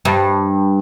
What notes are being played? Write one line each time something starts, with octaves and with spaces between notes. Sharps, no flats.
G2